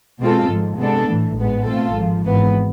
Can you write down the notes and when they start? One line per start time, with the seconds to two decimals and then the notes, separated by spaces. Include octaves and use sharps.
0.20 B2 G#3 C4 F4 A4
0.49 G#1 G#2 F3
0.78 C3 G#3 B3 D4 A4
1.07 A2 E3 A3
1.37 A1 G#2 G#3 B3
1.65 B2 A3 C4 F4 A4
1.94 G#1 G#2 F3
2.24 G#1 G#2 E3 B3